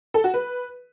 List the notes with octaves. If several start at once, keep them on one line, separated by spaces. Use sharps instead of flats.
A4
F#4
B4